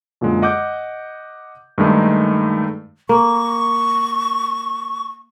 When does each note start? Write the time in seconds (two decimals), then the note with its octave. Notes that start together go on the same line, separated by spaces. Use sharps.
0.21 F#2 A#2 D3 G#3
0.42 D#5 F#5 D6 E6 G6
1.78 G2 D#3 G#3 A3 D#4
3.09 A#3 C#6